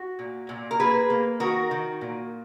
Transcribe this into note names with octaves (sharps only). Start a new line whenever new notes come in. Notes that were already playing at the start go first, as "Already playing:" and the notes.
Already playing: F#4
A#2
A#2
A#4
A#3 G#4 B4
A#3
D#3 F#4 A#4
D#3
A#2